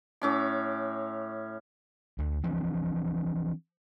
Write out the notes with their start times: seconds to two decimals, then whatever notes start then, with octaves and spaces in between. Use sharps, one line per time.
0.22 A2 C#4 D6
2.18 D2
2.44 E3 F3 C4 D4